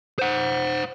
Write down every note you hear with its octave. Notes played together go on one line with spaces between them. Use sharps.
C5 F#5